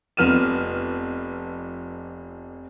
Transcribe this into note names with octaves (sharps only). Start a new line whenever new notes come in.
F1 F2 B3 F6 D#7 E7